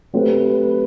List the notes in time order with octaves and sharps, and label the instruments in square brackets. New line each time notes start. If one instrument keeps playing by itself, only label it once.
[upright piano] F#3 A3 C4 G4 C5 [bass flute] B4